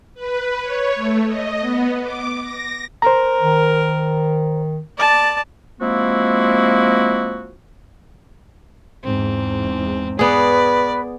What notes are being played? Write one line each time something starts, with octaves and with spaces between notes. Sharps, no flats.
B4
C#5
A3
D#5
B3
D6
A#6
A#4 C5 A#5
D#3
D5 A5
F3 G#3 A#3 C4 E4 F#4
E2 G#2 C4
B3 G#4 B4 D5